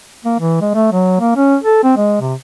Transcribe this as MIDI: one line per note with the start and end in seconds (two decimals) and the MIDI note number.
0.25 0.36 58
0.40 0.58 52
0.61 0.71 56
0.74 0.88 57
0.92 1.16 54
1.20 1.35 58
1.36 1.56 61
1.64 1.79 69
1.84 1.94 60
1.96 2.17 56
2.21 2.34 48